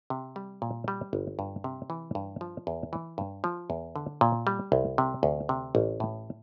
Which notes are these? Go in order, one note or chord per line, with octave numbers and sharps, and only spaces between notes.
C3
G3
A#2
G3
G1
G2
C3
E3
G2
F3
E2
E3
G2
F3
E2
D3
A#2
G3
C2
C3
D2
C3
A1
A2